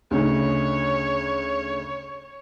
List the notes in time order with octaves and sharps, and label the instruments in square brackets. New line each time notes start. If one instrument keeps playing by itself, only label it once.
[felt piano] D2 C#3 D#4 [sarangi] C#5